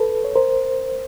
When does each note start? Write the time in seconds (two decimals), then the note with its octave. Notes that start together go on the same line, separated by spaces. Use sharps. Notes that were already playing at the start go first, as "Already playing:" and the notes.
Already playing: A4 B4
0.25 C#5
0.36 A#4 C5